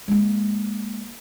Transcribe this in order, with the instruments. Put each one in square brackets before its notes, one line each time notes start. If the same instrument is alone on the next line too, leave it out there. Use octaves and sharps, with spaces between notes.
[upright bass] G#3 A#3